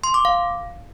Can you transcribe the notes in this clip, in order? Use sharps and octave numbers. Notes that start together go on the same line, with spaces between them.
C6
D6
F5